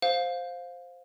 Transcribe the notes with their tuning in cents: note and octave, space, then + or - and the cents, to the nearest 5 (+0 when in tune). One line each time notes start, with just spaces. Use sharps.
C5 +0 F5 +15